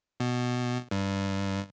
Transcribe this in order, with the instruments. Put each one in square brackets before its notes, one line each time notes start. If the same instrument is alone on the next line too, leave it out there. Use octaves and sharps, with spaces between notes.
[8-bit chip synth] B2
G2